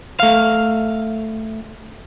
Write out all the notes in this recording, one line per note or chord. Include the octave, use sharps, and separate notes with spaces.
A3 F5